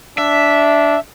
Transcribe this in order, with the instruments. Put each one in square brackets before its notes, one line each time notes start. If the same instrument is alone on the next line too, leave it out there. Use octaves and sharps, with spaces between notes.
[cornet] D4 [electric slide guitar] E5